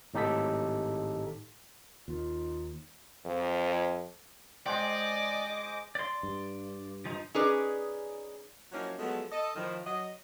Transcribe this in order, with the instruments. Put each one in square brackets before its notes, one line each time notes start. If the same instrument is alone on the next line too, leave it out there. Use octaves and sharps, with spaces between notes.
[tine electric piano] G#1 A2 D#4 G4 A4 B6
[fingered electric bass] D#2 [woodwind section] D#4 F4
[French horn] F2
[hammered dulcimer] G#3 C5 G5 [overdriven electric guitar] D5 [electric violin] D#5 D6
[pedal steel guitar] D5 C6
[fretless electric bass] G2
[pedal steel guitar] F3 D#4
[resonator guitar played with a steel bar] C#4 D#4 G#4 B4 D5 D#5
[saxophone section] F3 F#3 A#3 C#4 D#4 E4
F3 F#3 G#3 A3 B3
A4 D#5
A2 D#3 F3
F#3 D#5